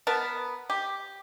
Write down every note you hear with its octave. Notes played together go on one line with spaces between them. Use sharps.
B3 A#4 A5
G4